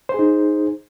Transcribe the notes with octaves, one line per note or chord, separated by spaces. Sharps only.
D#4 G#4 C5